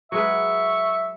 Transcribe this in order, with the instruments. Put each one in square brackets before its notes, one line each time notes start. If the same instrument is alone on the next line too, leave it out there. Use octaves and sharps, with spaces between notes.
[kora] F#3 G#3 B4 [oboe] E5 [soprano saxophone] C#6